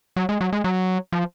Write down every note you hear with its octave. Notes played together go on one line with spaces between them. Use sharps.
F#3
G#3
F#3
G#3
F#3
F3